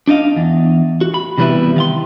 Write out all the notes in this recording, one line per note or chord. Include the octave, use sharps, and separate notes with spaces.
D4 D#4 D#5 F5
E2
F#4
B5
C3 E3 G3 B3 E4 B4
D#3 F5 C6